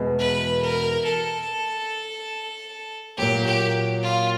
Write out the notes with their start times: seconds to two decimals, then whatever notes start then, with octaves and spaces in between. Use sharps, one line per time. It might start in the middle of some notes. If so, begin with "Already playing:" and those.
Already playing: E2 B2 G#3
0.20 B4
0.62 A#4
1.05 A4
3.17 A#2 F#3 A#3 G4
3.46 G4
4.03 F4